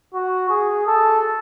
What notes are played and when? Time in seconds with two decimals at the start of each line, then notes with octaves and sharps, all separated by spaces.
0.14 F#4
0.50 G#4
0.87 A4